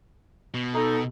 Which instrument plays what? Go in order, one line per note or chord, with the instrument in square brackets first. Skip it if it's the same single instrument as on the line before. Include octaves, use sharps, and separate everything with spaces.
[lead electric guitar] B2
[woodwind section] D#4 A4